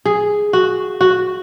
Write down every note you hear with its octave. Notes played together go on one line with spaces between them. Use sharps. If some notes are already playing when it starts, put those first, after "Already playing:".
G#4
F#4
F#4